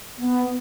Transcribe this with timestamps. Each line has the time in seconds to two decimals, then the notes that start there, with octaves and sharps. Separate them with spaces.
0.18 B3